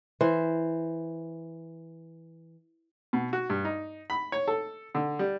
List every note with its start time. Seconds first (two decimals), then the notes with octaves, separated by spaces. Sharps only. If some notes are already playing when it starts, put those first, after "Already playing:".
0.21 E3 C5
3.13 B2
3.33 F#4
3.50 G2
3.65 D#4
4.10 B5
4.32 C#5
4.48 A4
4.95 D3
5.19 G3